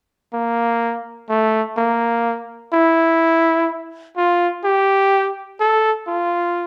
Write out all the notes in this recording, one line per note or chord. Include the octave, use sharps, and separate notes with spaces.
A#3
A3
A#3
E4
F4
G4
A4
F4